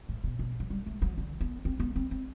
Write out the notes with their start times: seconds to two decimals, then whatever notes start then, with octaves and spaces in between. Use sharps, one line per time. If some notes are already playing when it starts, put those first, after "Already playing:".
0.09 A2
0.24 B2
0.39 B2
0.60 F#3
0.70 G3
0.86 A3
1.02 F#3
1.18 D3
1.41 B3
1.65 C4
1.80 B3
1.96 C4
2.11 C4